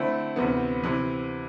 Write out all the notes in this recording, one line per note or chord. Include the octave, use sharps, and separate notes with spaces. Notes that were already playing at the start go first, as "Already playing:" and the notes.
Already playing: D3 A3 C4 E4
D2 C3 E3 B3
C3 E3